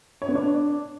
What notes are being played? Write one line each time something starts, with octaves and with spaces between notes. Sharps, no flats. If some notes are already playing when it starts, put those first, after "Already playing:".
C#5
B3
D4